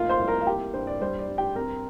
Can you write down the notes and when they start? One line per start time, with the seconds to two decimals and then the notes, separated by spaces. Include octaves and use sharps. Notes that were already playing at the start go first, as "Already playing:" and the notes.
Already playing: F1 A#3 F4 F5
0.09 C5 C6
0.19 C2
0.28 A#4 A#5
0.41 F5
0.47 A#3 G4 G5
0.74 G2 C5
0.87 D5
1.01 G3 C5
1.19 D5
1.29 G2
1.38 G4 G5
1.55 C4 A#4 A#5